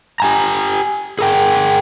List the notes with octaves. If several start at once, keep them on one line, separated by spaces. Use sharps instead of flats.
G4 G#5 A#5
G#4 A#4 G5